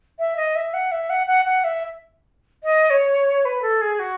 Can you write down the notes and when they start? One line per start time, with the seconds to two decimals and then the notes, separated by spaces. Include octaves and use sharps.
0.19 E5
0.37 D#5
0.55 E5
0.73 F#5
0.91 E5
1.09 F#5
1.27 F#5
1.45 F#5
1.64 E5
2.63 D#5
2.90 C#5
3.45 B4
3.62 A4
3.81 G#4
3.99 F#4